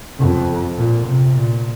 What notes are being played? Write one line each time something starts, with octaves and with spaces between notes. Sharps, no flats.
F2
A#2
C3
A#2